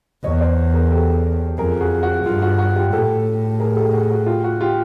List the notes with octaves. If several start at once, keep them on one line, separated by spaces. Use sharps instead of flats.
E2 C#5 D#5
C5 D5
G#4 A#4
G4 A4
F2 G#4 A#4
F#4 G#4
F#4
G2 F4
F#4
F#4
F4 G4
A2 G4 A4
G#4 A#4
G4 A4
F#4 G#4
F#4
F4 G4
F#4
F4 G4